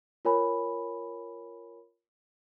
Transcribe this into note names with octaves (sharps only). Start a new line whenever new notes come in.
F4 A#4 C#5 G#5 B5